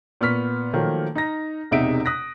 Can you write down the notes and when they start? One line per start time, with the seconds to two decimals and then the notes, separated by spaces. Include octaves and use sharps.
0.21 A#2 B3 C#6 F6 B6
0.73 D#3 F3 F#3 A3 A#3
1.15 D#4 A#5 A#6
1.71 E1 E2 C3 D#4 E5 D7
2.05 D#6 F#6 A#6 B6